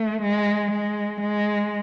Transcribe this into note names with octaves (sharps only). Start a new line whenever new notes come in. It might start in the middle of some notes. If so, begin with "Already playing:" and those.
Already playing: A3
G#3
G#3
G#3